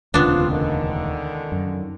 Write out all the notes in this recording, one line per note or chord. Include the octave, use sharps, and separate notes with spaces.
E1 D2 C#3 B3 C4 D4 F4
C#2 D3 D#3
F#2